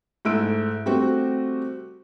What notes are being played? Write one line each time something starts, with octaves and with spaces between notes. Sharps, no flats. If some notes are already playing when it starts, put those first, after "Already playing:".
G#2 A3 E4 E6 D7
G3 A3 C4 F#4